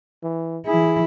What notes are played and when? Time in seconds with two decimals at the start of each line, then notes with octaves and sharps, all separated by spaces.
0.23 E3
0.66 E3 E4 G#4